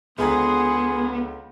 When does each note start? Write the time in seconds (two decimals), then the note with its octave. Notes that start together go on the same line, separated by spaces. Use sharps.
0.18 C#2 D3 B3 G#4 F#5 A#5 C6